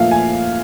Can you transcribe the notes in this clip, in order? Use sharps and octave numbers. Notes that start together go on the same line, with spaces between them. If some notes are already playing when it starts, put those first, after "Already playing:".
Already playing: A#2 F3 A3 E5 F5
G#5